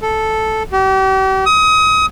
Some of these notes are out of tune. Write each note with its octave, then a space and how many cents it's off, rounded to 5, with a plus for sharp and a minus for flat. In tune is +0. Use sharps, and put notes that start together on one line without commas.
A4 -5
G4 -40
D#6 +30